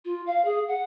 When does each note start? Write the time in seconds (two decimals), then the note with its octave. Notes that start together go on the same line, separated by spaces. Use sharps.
0.05 F4
0.27 F5
0.45 G#4
0.68 F#5